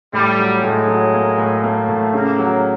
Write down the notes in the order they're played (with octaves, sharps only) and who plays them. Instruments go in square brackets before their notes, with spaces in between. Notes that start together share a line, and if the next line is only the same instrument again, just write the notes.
[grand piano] A2 [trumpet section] G3
[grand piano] F#3
[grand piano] A2 [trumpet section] G#3
[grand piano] F#3
A#3
A2
[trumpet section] A3 [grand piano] A#3
[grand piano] A2
[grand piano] C#3 [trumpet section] A#3
[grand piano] F#3